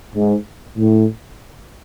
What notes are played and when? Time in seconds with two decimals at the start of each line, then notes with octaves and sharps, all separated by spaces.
0.15 G#2
0.77 A2